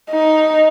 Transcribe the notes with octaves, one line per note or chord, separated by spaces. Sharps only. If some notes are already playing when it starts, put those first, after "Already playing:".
D#4